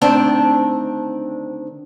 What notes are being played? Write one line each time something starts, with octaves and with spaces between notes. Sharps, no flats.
D2 D#3 C4 D4 A5